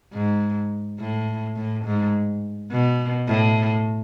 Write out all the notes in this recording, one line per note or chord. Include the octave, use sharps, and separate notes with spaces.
G#2
A2
A2
G#2
B2
A2